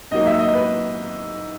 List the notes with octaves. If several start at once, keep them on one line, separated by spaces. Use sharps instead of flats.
G#2 F#3 A#3 D#5
E5
D#5
B4